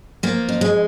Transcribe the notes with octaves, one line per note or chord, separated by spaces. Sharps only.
F3 A#3
F2
G#3